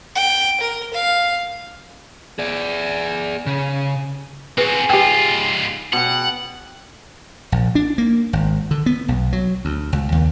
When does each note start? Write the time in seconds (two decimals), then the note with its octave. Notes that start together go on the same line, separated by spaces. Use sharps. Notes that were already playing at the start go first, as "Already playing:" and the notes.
0.16 G5
0.61 A#4
0.94 F5
2.39 G#4 D5
3.46 C#3
4.58 C4 F#4 G#4 B4
4.90 G#2 F4 G4 G5
5.93 B2 F#5 G5
7.52 A#1
7.75 D4
7.98 A#3
8.33 G#1
8.71 D3
8.86 B3
9.08 B1
9.33 F#3
9.65 D2
9.93 C#2
10.12 D#2